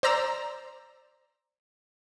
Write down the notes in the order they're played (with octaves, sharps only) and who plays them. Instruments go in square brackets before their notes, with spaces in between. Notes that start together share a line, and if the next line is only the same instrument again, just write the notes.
[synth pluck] C5 D5 A#5 E6